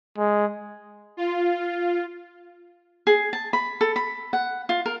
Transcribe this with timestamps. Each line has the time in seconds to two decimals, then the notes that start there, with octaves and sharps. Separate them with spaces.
0.18 G#3
1.17 F4
3.07 G#4
3.33 A5
3.53 B5
3.81 A4
3.96 B5
4.33 F#5
4.69 F4
4.86 A#4